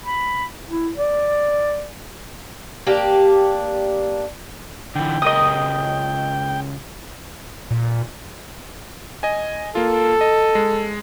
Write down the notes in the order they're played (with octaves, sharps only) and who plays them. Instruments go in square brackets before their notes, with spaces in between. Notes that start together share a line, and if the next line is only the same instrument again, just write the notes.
[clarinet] B5
E4
D5
[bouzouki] A#3 D4 G4
[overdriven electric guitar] D3 E3 [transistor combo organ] G5
[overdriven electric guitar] C#2 A#4 [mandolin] D#5 D#6
[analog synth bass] A#2
[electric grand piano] D#5 G#5
[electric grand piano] A#3 F4 [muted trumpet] A4
[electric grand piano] D#5
G#3